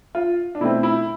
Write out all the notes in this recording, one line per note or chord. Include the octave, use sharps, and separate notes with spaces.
F4
D4
B2 A3 C4 E4
E4